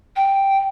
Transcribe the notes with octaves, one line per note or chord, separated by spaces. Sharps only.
G5